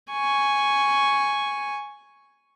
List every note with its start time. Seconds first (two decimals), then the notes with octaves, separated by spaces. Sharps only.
0.11 G#5 C#6